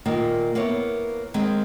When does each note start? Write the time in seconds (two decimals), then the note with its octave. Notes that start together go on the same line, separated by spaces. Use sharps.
0.06 A#2 D#3 A#3
0.55 A#3 B3 E4 C#5
1.34 D#2 D#3 G#3 C4